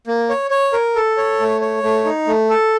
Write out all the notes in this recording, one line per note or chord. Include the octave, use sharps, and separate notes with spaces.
A#3
C#5
C#5
A#4
A4
C#5
A3
C#5
A3
D#4
A3
A4